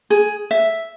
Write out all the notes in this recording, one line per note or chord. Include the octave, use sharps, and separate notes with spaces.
G#4
E5